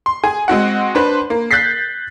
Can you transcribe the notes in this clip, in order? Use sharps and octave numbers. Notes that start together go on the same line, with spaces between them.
C6
G#4 G#5
G#3 C4 F#4 F#5
D4 B4 C5
A#3
F#6 G6 A6 B6 C7